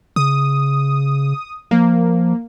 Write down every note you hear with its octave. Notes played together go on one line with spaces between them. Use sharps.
C#3 D#6
F3 A#3